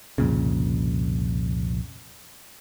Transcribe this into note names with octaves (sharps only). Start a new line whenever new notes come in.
C2 F2 A#2 C#3